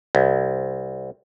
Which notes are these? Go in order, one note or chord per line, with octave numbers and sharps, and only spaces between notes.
C2